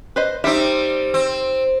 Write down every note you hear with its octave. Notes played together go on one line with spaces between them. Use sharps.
B4 C5 D#5
G3 C4 D#4 E5
C4